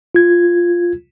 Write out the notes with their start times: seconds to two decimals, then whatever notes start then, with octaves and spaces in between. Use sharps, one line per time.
0.15 F4 G#6